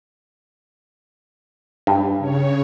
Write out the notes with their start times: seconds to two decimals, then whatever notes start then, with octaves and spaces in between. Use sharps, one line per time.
1.87 G2
2.18 C#3 C#5